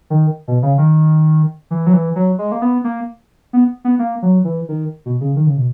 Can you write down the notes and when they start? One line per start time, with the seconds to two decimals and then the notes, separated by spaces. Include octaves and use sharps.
0.10 D#3
0.48 B2
0.63 C#3
0.78 D#3
1.71 E3
1.87 F#3
1.93 E3
2.16 F#3
2.39 G#3
2.52 A#3
2.62 B3
2.84 A#3
3.53 B3
3.85 B3
3.99 A#3
4.22 F#3
4.44 E3
4.69 D#3
5.06 B2
5.21 C#3
5.36 D#3
5.47 C#3
5.57 B2